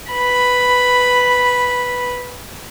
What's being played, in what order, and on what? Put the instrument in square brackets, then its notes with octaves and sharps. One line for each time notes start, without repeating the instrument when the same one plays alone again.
[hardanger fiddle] B4 B5